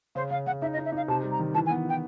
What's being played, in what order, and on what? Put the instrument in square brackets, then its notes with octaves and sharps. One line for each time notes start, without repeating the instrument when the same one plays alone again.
[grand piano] C#3 [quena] C5
[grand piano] C#3 [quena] F5
[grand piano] C#3 [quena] F#5
[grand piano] D#4 [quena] E5
[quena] D#5
[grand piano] D#4
[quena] E5
[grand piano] D#4 [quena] F5
[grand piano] C3 [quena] A5
[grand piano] G3
[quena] A#5
[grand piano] D#3
[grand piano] E3 [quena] A5
[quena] G#5
[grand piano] B3
[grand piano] E3 [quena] G5